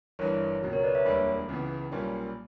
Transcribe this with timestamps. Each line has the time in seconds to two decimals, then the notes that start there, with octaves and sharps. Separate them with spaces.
0.19 G1 G2 E3 A#4 C#5
0.62 C#2 B2 F#3
0.73 A#4 C#5
0.84 B4 D5
0.95 C#5 E5
1.05 E1 D2 D3 G3 A#3 B5 D6
1.49 C#2 C#3 E3 B3
1.92 B1 A#2 G3 A#3 C#4